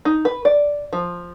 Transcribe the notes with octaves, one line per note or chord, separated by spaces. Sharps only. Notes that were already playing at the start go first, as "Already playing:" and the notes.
D#4
B4
D5
F3